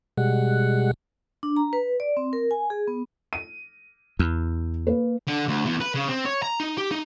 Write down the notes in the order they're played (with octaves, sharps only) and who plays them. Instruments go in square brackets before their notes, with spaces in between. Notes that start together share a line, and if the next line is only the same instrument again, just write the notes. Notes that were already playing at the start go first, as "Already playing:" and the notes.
[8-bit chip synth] B2 [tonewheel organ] G3 G#3 F#5
[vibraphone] D4
A#5
B4
D5
C4
A#4
G#5
G#4
B3
[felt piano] D#7
[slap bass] E2
[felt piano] A#3 B4
[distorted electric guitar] D3
D2
E2
B4
C#3
C4
C#5
A#5
D#4
G4
D#4